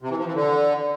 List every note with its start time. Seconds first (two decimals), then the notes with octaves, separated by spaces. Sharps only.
0.02 C3
0.10 E3
0.18 F3
0.27 E3
0.35 D3